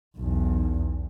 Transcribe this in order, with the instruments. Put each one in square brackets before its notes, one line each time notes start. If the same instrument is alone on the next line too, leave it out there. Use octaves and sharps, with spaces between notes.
[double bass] B1 E2